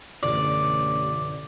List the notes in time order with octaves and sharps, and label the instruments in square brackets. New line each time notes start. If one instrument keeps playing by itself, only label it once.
[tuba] A1 [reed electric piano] F#2 B2 D3 [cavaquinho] D5